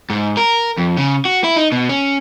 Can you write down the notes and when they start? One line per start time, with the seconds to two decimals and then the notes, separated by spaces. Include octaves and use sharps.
0.10 G#2
0.37 A#4
0.78 F2
0.97 C#3
1.25 F#4
1.44 E4
1.56 D#4
1.72 B2
1.89 C#4